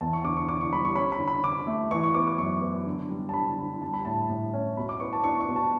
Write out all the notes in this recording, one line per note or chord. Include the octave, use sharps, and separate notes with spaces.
E2 A5
C#6
D3 D6
C#6
D3 D6
C#6
G3 B5
C#6
C#4 B5
B5
D3
B5
D3 D6
A3
E3 C#6
C#6
B3 D6
D6
F#2 C#6
B3
D3
G3
A5
D3 B5
D3
G3 A5
B5
A2 A5
A2
C#4
B2 B5
D6
B3 C#6
A5
D4 C#6
C#6
B2
A5